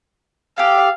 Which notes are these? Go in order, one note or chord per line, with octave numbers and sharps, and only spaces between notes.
G4 A4 F5